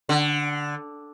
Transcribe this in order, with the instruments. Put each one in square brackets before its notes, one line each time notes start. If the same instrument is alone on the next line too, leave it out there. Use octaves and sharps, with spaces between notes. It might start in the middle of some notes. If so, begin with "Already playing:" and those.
[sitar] D3